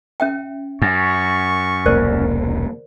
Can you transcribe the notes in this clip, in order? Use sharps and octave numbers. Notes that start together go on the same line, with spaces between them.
C#4 E5 G5
F#2 C#6
E1 C2 A#3 A#4 C5 D5